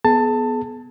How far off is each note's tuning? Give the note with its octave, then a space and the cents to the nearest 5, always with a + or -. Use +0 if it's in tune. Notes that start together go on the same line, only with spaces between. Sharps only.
B3 +0 G#4 +35 A5 +15